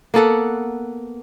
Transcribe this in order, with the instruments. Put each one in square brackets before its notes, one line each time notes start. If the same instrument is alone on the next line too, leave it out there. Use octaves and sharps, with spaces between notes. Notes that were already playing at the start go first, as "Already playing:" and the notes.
[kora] A#3 B3 A4 F#5